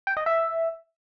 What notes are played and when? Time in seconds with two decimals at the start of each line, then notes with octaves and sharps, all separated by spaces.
0.07 G5
0.17 D#5
0.26 E5